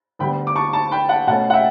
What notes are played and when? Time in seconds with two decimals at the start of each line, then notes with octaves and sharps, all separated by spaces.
0.19 D2 D3 G3 B3 G5 B5
0.47 D6
0.55 A5 C#6
0.73 A5 C#6
0.91 G5 B5
1.09 F#5 A5
1.27 B2 A3 C#4 F#5 A5
1.50 F#5
1.54 E5 G5